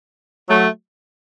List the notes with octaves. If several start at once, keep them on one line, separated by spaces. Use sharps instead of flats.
F#3 A3